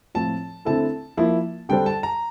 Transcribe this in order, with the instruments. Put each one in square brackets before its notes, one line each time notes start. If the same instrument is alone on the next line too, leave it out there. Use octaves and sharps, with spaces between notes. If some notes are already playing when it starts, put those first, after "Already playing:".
[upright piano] A2 F3 A3 C4 F4 [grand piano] A5
[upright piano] D3 A3 C4 E4 A4 [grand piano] A5
[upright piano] F3 A#3 E4
[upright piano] D3 G3 D4 A4 C5 [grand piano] G5
[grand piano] A5
A#5